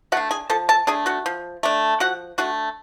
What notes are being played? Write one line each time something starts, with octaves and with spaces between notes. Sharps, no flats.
A3 D4 F#4 F#5
G#4 G#5
F3 A4 A5
A4 A5
A3 D4 G#4 G#5
F#4 F#5
F3
A3 D4
F3 F#4 F#5
A3 D4 F#4 F#5